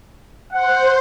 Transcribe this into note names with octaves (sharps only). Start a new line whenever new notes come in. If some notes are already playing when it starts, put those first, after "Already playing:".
C5 F#5